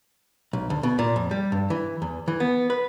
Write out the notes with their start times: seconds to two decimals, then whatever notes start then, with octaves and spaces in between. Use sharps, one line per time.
0.53 B1
0.70 D2
0.83 B2
0.99 A#2
1.16 F2
1.31 G3
1.52 G2
1.70 E3
2.02 E2
2.28 E3
2.40 B3
2.70 B4